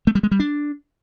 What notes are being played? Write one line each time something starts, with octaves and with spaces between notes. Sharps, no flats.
A3
G3
G#3
G3
D4